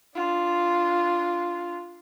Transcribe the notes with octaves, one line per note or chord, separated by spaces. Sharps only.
D4 F4